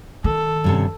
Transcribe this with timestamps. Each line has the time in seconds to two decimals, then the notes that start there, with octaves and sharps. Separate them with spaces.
0.24 D#3 A4
0.64 G2 C3 C#4